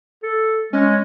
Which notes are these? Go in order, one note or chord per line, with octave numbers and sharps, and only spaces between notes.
A4
G#3 C#4